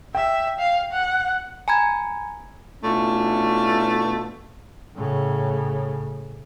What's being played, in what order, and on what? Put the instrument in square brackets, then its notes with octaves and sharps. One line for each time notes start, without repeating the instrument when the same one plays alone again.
[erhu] E5 [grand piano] G5
[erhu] F5
F#5
[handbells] G#5 A#5 B5 G#6
[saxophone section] B2 A3 C#4 D4 E4 F4
[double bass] A2 C#3